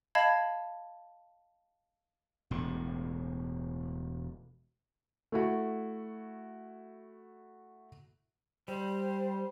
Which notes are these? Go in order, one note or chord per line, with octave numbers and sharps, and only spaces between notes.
D#5 F5 A5 B5 G#6
E1 A2
A3 E4 F#4
G3 C5